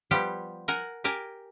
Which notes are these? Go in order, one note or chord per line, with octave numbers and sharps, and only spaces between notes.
F3 G3 B3 G4
A#4 F#5 G#5
G4 A#4 G#5 A5